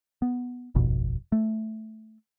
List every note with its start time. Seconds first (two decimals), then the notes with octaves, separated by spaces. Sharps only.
0.22 B3
0.75 D#1 G#1 F2 B2
1.32 A3